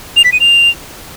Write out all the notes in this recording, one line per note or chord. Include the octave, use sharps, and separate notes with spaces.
F7
B6
D#7
F7